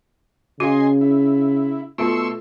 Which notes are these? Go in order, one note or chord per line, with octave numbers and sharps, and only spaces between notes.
C#3 F#4 D#5 F5 G#5 C6
E4
B2 A3 F4 C6 C#6 E6